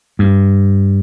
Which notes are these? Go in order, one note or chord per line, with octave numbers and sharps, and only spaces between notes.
G2